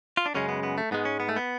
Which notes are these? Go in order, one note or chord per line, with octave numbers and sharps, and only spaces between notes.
F4
D4
F#2 C#3 G#3 C#4
B3
B3
A3
G#2 G#3 B3
C#4
B3
A3
B3